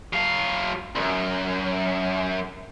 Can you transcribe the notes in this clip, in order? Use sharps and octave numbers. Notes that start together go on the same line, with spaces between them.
F#3 F5
C2 F#2